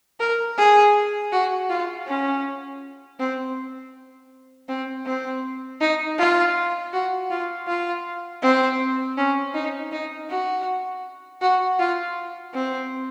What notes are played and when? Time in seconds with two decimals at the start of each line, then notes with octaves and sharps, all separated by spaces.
0.20 A#4
0.58 G#4
1.32 F#4
1.69 F4
2.07 C#4
3.19 C4
4.68 C4
5.06 C4
5.81 D#4
6.18 F4
6.93 F#4
7.30 F4
7.67 F4
8.42 C4
9.17 C#4
9.54 D#4
9.92 D#4
10.30 F#4
11.41 F#4
11.79 F4
12.54 C4